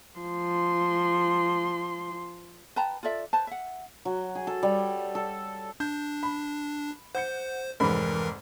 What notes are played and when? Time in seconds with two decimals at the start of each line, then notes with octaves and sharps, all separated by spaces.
0.20 F3 C6
2.76 B4 G5 A5 A#5
3.03 F4 A4 D5 E5
3.33 B4 C5 A5
3.47 E5 F#5
4.05 F#3
4.35 G#4
4.47 A4
4.63 G3
5.15 A4
5.80 D4 G6
6.23 B5
7.15 C5 F#5 G6 C#7
7.80 F1 G#2 E3 A#4 B5